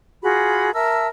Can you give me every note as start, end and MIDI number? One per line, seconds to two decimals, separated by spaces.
0.22 0.73 65
0.22 0.73 66
0.22 0.73 68
0.22 0.73 83
0.74 1.07 70
0.74 1.07 76
0.74 1.07 81
0.74 1.07 88